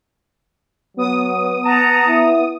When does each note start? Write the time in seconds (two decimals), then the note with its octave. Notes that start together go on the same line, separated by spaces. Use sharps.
0.97 F#3 B3 D#6
1.66 F#5 A5 A#5
2.08 E4